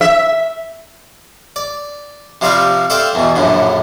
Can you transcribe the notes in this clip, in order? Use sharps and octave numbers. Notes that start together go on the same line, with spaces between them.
E5
D5
C3 F3 G3 C5 D5 F5
A4 C5 D5 E5 F5 G5
E2 B2
A#1 F#2 A2 D3